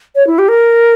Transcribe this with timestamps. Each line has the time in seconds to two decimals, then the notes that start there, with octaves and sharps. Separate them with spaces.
0.16 C#5
0.27 E4
0.39 G4
0.49 A#4